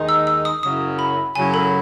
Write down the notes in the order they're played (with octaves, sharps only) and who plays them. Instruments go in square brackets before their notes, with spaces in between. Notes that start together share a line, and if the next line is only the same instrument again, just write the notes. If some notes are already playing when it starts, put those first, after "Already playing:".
Already playing: [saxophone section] D#2 D#3 G#3 D#4
[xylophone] E6
E6
D#6
[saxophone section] F#2 C#3 F#3 C#4 E4 [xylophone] D#6
[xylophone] B5
[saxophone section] F#2 C#3 F#3 C#4 E4 [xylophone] G#5
[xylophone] A4